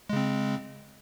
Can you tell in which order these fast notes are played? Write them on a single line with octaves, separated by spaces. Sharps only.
G#3 C#3 C4